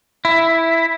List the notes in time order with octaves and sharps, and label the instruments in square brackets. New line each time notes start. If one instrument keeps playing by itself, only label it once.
[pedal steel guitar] E4